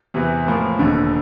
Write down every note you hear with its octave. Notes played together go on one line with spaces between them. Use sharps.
E2 C3 E3
A2 F3 A#3
E1 D#2 D3